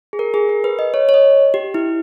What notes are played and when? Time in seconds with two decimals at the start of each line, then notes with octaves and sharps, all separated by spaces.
0.13 G#4
0.19 A#4
0.34 G#4
0.49 A#4
0.64 B4
0.79 D#5
0.94 C#5
1.09 C#5
1.14 D#5
1.54 G4
1.74 E4